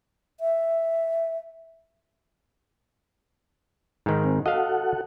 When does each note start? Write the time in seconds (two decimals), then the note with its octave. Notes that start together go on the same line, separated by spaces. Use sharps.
0.40 E5
4.06 G#2 D#3
4.24 C4
4.46 F#4 A4 D#5 F5 F#5